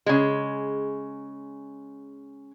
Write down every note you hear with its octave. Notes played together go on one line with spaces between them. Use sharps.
C#3 G#3